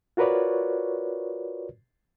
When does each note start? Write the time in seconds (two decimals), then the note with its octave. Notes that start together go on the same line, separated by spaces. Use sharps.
0.17 F4 F#4 A#4 B4 C#5 D5